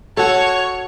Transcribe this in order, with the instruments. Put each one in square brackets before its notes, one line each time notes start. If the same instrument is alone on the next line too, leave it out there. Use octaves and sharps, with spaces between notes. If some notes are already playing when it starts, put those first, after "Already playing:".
[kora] F#4 A4 [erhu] C#5